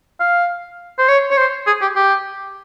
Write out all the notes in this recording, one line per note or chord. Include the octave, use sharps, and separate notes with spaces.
F5
C5
C#5
C#5
C5
G#4
G4
G4